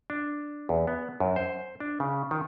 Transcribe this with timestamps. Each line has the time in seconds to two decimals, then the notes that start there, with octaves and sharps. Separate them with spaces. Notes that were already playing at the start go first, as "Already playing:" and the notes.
0.10 D4
0.69 E2
0.87 B3
1.20 F#2
1.36 C5
1.80 D4
2.00 C#3
2.31 D#3